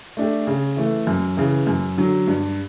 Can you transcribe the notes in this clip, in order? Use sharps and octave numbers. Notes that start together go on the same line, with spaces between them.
A3 D4 G4
C#3
E3 A3
F#2
C#3 E3
F#2
D3 F#3
G2